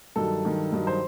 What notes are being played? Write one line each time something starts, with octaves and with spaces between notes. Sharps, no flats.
G2 D#3 F#3 A4
G2 D#3 F#3
G2 D#3 F#3
C5